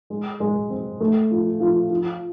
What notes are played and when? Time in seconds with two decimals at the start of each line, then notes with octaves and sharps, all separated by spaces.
0.10 G#3
0.40 G#3
0.70 C4
1.01 A3
1.31 F3
1.60 F3
1.90 F3